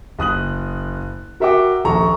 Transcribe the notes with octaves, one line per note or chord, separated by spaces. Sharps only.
F#1 D#6 F#6 F#7
F#4 A#4 E5 F#5 G5 D6
D#1 A#1 A4 A#5 C#6